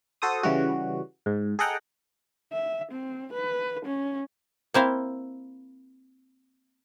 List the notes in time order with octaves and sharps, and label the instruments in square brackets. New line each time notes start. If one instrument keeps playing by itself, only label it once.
[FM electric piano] F#4 A4 C5 D#6
C#3 E3 G3 F#4
G#2
G#4 A4 D#5 F#5 G5 A#5
[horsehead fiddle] E5
C4
B4
C#4
[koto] A#3 C4 E4 F5